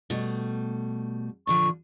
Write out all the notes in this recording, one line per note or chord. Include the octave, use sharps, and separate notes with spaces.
B2 G3 A3
A#2 D3 F3 C#6